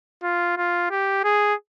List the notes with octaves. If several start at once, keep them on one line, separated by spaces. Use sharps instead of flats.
F4
F4
G4
G#4